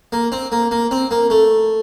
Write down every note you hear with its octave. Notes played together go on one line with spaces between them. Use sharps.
A#3
C4
A#3
A#3
C4
A#3
A3